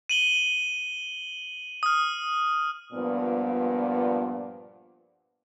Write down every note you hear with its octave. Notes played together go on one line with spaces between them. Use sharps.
D#7 F#7 G7
D#6 F6
G2 A#2 F3 B3